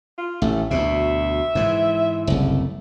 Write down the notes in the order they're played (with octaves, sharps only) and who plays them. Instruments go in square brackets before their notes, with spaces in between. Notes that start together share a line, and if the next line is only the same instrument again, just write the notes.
[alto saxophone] F4
[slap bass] A1 [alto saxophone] A3
[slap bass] D2 B2 [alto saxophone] E5
[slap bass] G#2 E3
[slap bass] F#1 C2 [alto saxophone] A3